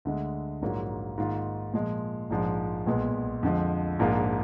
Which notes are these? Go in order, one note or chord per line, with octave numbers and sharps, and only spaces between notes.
D2 D3 G#3
A#1 G#2 F#3 A#3 F4
G#2 D#3 A#3 F4
A#2 F3 G#3
A#1 G#2 F3 G#3
B1 A#2 G#3 B3
F2 D3 F3 G#3
A#1 G#2 F3 A#3 F4